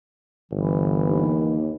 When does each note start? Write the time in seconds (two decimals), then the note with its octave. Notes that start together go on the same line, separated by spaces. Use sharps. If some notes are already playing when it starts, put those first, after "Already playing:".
0.51 G1 E3
1.07 D#2